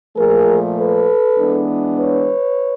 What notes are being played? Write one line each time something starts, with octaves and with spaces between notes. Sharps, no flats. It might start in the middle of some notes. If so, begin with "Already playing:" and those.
A#2 F3 A3 G#4 A#4
A4 B4
E3 G#3 B3 D4
B4 C#5